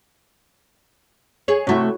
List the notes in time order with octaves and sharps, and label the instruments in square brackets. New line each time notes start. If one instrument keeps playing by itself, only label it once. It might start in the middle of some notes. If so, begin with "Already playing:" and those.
[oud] G#4 C#5
[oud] C3 A3 [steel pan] E4 F#4 C#5